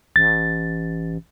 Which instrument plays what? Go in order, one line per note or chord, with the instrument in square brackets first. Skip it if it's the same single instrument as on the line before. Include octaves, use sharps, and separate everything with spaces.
[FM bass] A1 [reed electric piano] A6